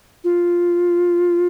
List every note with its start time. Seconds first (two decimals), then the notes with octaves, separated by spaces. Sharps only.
0.24 F4